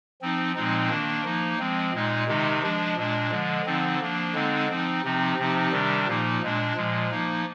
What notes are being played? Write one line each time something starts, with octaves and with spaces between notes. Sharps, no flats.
F3 C4 D#4
A#2 F3 G#3 C4 D#4
D#3 A#3 D4
F3 A#3 D#4
F3 G#3 C4
A#2 G#3 D#4
C3 D#3 G#3 D#4
F3 G#3 D4
A#2 G#3 D4
D3 F3 G#3
D3 F3 C4 D#4
F3 A#3 D4
D3 G#3 C4 D#4
F3 C4 D#4
C3 F3 C4 D#4
C3 F3 C4 D#4
C3 D#3 G3 D4
A#2 F3 A#3 D#4
A#2 G#3 D4
A#2 F3 G#3
F3 A#3 D#4